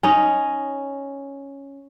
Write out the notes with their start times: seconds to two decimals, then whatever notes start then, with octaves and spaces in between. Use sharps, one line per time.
0.03 C#4 D#4 D#5